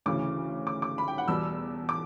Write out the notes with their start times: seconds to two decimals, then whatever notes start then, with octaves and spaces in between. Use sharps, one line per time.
0.06 D2 C#3 E3 D6
0.67 D6
0.82 D6
0.98 B5
1.08 G5
1.18 F#5
1.28 E2 B2 G3 E6
1.89 D6